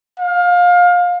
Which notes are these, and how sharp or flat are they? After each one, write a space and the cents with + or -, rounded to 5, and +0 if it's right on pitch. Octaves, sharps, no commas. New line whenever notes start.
F5 +25